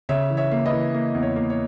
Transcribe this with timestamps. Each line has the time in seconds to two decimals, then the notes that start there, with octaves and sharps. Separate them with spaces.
0.09 C#3 C#5 E5
0.30 E3
0.37 C#5 E5
0.51 A#3
0.66 B4 D#5
0.73 E3
0.94 A#3
1.15 E2
1.23 C#5
1.36 A#3
1.50 C#5